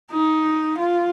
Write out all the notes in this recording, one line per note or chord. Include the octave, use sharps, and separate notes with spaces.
D#4
F4